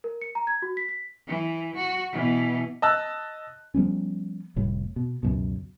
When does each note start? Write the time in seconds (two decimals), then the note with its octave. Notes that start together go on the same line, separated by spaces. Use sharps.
0.04 A#4
0.22 C#7
0.35 A#5
0.47 G#6
0.62 F#4
0.77 B6
0.89 B6
1.27 E3
1.76 F#4
2.12 B2 E3
2.82 D#5 A5 E6 F#6
3.74 F3 G3 B3 C#4
4.56 F1 A2 G3
4.96 B2
5.23 C#2 F#2 B2